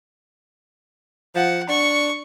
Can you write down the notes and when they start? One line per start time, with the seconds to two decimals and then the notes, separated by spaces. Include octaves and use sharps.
1.35 F3 F#5
1.69 D4 C#6